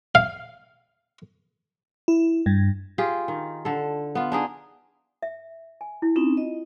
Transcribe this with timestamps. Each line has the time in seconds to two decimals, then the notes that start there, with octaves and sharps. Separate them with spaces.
0.15 F5
2.08 E4
2.46 G2
2.98 F4 G4 G#4
3.28 D#3
3.65 D3 A4
4.15 B3 F4
4.32 D4 D#4 G#4
5.23 E5
5.81 G#5
6.02 E4
6.16 C4 C#4 D#4 F4
6.37 D#5